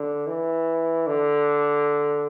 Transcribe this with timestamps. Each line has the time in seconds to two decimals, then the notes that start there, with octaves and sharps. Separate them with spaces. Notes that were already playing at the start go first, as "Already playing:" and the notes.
Already playing: D3
0.27 E3
1.07 D3